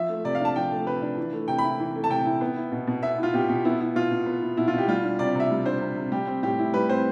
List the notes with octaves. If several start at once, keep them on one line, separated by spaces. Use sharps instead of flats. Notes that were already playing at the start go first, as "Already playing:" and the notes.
Already playing: F3 E5
A3
C3 D5
F5
D4 A5
F3 G5
A3
C3 B4
D4
E3
A3
C3 G5
B5
E4
E3
A3
A5
C3 G5
E4
B3
E4
B2
B2
B3 E5
E4 F4
B2 G4
B2
B3 E4
E4
B2 F4
B2
B3
E4
B2 E4
F4
B2 G4
G3 F4
D4
C3 D5
C3 E5
G3
D4 C5
C3
C3
G3 G4
C4
A2 G4
E4
G3 B4
C4 C5